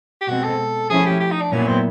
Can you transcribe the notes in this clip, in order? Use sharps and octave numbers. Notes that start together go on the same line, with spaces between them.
G4
B2 G#3 C4 F#4
A4
F3 A3 C#4 E4 G#4
G4
G4
D#4
D4
A#2 F#3 B3 C#4 E4
C4